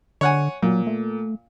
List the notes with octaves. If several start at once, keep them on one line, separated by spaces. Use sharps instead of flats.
D3 C#5 F#5 G#5
A#2 F#3
A3